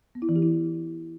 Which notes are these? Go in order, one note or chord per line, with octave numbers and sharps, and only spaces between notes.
B3
E4
E3
G4
E4